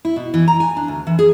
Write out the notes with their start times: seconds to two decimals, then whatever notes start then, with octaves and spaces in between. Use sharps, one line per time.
0.05 E4
0.16 B2
0.34 E3
0.48 A#5
0.60 G#5
0.77 D4
0.88 D2
1.07 E3
1.19 G#4